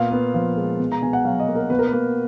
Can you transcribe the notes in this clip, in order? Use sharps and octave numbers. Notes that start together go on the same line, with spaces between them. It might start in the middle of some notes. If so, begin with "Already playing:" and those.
Already playing: A#2 B3 F5
B3
F3
G#3
B2
A#5
B2 G#5
F#5
F#3 F5
D#5
A#3
A#4
B2 B4
A#4
B4
A#3